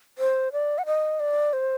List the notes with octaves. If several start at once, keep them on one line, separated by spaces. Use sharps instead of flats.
C5
D5
F#5
D#5
D5
C5